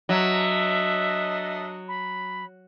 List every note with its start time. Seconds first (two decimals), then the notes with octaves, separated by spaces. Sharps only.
0.09 F#3 D4 A4 D#5 E5
1.88 B5